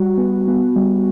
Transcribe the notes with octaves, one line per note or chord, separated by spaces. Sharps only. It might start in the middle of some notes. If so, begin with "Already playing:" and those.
Already playing: G3 F#4
B3
B3
G3